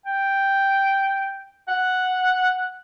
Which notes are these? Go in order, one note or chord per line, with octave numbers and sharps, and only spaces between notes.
G5
F#5